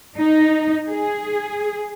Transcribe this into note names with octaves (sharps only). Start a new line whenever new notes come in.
D#4
G#4